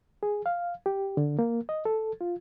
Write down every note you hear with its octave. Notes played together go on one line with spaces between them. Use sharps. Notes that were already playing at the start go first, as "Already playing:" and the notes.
G#4
F5
G4
D3
A#3
D#5
A4
F4